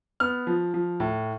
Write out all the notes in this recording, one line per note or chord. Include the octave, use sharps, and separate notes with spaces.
B3 F6
F3
F3
A2